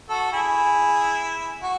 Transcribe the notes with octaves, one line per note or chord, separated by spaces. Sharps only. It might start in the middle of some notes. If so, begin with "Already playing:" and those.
F#4 A4
E4 G#4
F#4